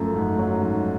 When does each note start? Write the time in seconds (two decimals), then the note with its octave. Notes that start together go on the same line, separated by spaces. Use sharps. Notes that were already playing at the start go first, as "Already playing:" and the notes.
Already playing: F#2 F3 A3
0.16 G#2
0.39 F#3
0.61 G#2